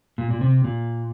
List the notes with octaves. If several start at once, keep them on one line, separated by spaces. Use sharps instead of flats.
A#2
A#2
C3
A#2